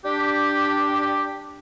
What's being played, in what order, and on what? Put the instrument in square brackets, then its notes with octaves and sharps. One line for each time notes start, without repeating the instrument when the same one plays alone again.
[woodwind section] D4 G4